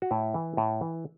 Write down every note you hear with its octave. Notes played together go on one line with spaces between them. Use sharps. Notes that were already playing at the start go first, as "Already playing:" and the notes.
F#4
A2 E4
E3
A2
E3